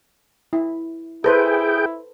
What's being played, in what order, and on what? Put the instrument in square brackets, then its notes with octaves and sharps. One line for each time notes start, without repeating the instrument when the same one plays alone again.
[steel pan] E4
[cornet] E4 [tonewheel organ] G#4 G5 [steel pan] A4 B4 C5